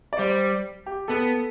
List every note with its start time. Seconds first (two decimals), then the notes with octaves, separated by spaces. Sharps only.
0.13 D5
0.18 G3 C5
0.86 G4
1.08 B3 A4